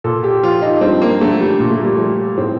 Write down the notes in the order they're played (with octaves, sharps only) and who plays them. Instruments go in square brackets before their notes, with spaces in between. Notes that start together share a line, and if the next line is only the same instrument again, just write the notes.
[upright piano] A#2 A4
G4
F3 F4
D#4
G2 C4
A#3
D3 F3 A3
G3
A#2 A#3
A3
G3
F3 A3
A2 C4